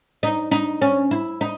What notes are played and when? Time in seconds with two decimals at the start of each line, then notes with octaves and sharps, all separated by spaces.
0.23 D#4
0.51 D#4
0.81 C#4
1.11 E4
1.41 D#4